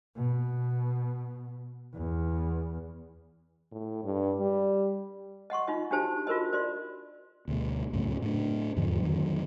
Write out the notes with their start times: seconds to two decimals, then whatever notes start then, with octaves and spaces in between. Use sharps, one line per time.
0.16 B2
1.94 E2
3.72 A2
4.04 G2
4.40 G3
5.50 D#5 F#5 C6 C#6
5.67 D#4 F4 D#5
5.91 D4 F#4 G4 C5 A5
6.27 F4 F#4 A#4 C5 D#5
6.53 C5 D5 C6
7.48 D2 B2
7.93 C#2 F#2 A2 C#3
8.22 A2 D4
8.76 E2 G#2 D3 F3
9.02 F2 D3 D#3 F#3